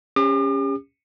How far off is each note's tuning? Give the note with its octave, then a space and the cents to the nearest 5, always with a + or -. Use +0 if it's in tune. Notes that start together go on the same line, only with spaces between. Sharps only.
C#4 +0 G4 +40 D6 +45